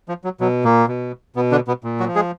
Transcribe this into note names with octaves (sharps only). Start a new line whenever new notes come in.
F3
F#3
B2 F#3
A#2 A#3
B2
B2 B3
D3 D4
B2 B3
A#2
F#3 F#4
F3
G#3 G#4